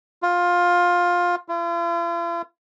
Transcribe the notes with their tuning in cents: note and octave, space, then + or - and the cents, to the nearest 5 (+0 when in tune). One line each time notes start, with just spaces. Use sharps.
F4 +15
F4 -45